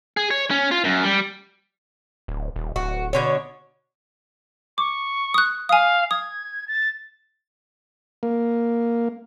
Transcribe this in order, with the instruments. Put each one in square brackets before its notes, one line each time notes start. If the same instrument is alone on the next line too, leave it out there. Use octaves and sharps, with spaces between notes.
[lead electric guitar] G#4
C#5
C#4
F4
F#2
G3
[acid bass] D1
D#1
[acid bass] D1 [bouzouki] F#4
[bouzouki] B2 D3 C#5
[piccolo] C#6 [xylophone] D6
[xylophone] D#6 F#6
[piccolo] F5 [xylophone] G#5 D#6
[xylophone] D#6 [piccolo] G#6
[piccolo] A6
[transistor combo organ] A#3